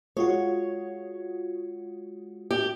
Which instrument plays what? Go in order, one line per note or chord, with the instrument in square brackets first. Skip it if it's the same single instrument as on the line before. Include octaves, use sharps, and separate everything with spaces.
[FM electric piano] G#3 F4 F#4 [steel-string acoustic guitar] C#5
[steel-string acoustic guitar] G4